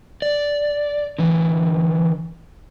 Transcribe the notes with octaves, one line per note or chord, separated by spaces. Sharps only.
D5
D3 E3